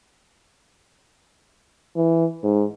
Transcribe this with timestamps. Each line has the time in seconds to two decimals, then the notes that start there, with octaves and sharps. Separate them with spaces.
1.96 E3
2.43 G#2